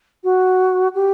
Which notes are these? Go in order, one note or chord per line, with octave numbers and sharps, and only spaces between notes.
F#4
G4